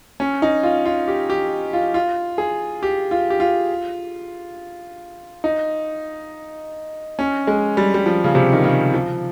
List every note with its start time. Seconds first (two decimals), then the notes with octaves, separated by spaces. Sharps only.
0.20 C#4
0.42 D#4
0.63 F4
0.86 F4
1.08 G4
1.30 G4
1.73 F4
1.94 F4
2.38 G#4
2.83 G4
3.11 F4
3.30 G4
3.40 F4
5.44 D#4
7.19 C#4
7.47 G#3
7.77 G3
7.94 G3
8.06 F3
8.24 C#3
8.35 C3
8.53 D#3
8.64 C#3
8.94 F3